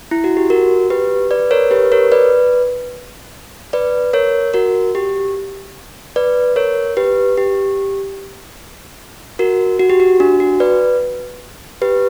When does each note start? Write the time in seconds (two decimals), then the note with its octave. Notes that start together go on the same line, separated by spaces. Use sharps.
0.11 E4
0.24 F#4
0.37 G4
0.50 F#4 A#4
0.90 G4 B4
1.31 B4 D5
1.51 A#4 C#5
1.71 G4 B4
1.92 A#4 C#5
2.12 B4 D5
3.73 B4 D5
4.13 A#4 C#5
4.54 F#4 A#4
4.95 G4
6.16 B4 D5
6.56 A#4 C#5
6.97 G4 B4
7.37 G4
9.39 F#4 A#4
9.80 F#4
9.90 G4
10.00 F#4
10.20 D4
10.40 F#4
10.60 B4 D5
11.82 G4 B4